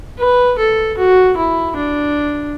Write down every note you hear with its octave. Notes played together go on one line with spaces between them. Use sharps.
B4
A4
F#4
E4
D4